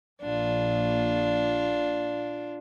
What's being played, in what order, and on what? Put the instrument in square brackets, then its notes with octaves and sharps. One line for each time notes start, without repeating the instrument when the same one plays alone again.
[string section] A#1 [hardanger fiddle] D4 F4